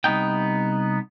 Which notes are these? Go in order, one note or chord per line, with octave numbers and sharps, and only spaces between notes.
C2 B3 D#4 G5